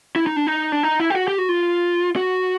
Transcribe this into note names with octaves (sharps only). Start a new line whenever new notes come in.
E4
D#4
D4
D#4
D4
D#4
E4
G4
F#4
G4
F#4
F4
F#4